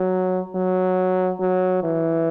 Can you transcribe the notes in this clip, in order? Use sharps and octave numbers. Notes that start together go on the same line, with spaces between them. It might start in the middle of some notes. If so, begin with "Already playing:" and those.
Already playing: F#3
F#3
F#3
E3